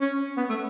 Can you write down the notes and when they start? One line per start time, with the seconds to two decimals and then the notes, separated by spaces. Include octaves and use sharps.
0.01 C#4
0.37 B3
0.50 A3